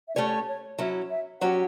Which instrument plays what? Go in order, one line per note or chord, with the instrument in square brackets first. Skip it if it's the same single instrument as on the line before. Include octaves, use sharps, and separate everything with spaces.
[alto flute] E5
[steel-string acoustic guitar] A3 C#4 G4 C#5 [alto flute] D5
[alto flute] C#5
[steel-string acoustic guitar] F#3 C#4 E4 [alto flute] E5
[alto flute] E5
[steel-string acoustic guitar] F#3 C#4 G4 C#5 [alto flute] F#5